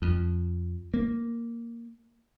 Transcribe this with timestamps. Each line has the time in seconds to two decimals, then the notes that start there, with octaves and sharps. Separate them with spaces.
0.02 F2
0.94 A#3